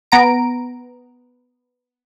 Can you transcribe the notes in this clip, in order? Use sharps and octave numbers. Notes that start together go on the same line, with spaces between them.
B3 A#5 D7